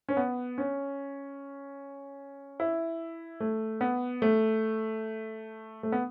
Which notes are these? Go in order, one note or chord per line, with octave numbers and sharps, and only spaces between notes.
C#4
B3
C#4
E4
A3
B3
A3
A3
B3